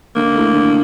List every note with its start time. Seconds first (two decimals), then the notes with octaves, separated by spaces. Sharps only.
0.16 D3 A#3
0.35 A3 E4 A4
0.54 D3